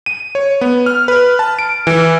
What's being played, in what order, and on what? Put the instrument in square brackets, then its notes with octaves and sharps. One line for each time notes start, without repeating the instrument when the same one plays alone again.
[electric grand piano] D#7
C#5
B3
F6
B4
A5
D7
E3